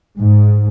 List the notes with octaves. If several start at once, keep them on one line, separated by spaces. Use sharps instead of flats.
G#2